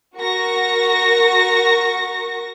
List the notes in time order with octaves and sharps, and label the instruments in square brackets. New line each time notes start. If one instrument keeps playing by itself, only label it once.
[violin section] F#4 A#4 C#6 A#6